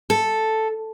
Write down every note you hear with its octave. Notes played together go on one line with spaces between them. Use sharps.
A4